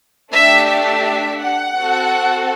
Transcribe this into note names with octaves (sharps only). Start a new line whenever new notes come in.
A3 D4 G4 E5
E5
F#5
C4 F#4 A4